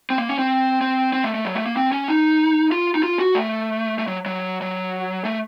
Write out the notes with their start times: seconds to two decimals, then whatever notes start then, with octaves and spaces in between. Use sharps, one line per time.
0.10 C4
0.18 A#3
0.29 C#4
0.39 C4
0.81 C4
1.13 C4
1.24 A3
1.35 A3
1.45 F#3
1.55 A3
1.66 A#3
1.77 C4
1.92 C#4
2.08 D#4
2.72 F4
2.95 D#4
3.03 F4
3.19 F#4
3.35 A3
3.99 A3
4.07 F#3
4.26 F#3
4.62 F#3
5.25 A3